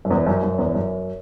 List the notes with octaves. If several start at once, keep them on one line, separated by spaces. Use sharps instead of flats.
F#2
E2
F#2
F#2
E2
F#2